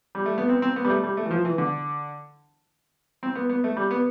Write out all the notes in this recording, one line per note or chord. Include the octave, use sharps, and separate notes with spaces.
G3
A3
B3
C4
C4
B3
G3
A3
G3
A3
E3
F3
E3
D3
C4
B3
B3
A3
G3
B3